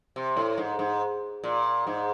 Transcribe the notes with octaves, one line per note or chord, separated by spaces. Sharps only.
C3
A2
G#2
G#2
A#2
G#2